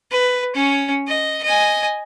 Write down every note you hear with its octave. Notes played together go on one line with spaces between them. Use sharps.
B4
C#4 C#5
D#5
D#5 G#5